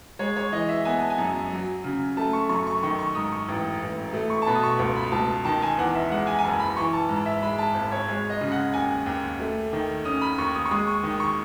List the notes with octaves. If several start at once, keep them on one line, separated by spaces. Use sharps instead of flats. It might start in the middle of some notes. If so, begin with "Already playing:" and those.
G#3 C#5
C#5
E3 D#5
E5
B3 G#5
A5
G#5
F#2
F#3
C#3
A3 A5
C#6
F#2 C#6
C#6
D#3 C#6
C#6
G#2 D#6
C#6
A1
A1
A3
C#6
A5
B2 B5
D#6
C#6
C#2
B5
C#2 A5
D#3 A5
G#5
E2 F#5
E5
G#3 F#5
G#5
G#5
F#1 A5
B5
E3 C#6
A5
G#2
E5
G#3 B5
A5
G#1
C#5
G#3 C#5
D#5
C#3
F#5
D#2 G#5
D#2
A3
D#3
C#4 D#6
B5
D#2 C#6
D#6
C#6
G#3 D#6
C#6
D#3
D#6
C#6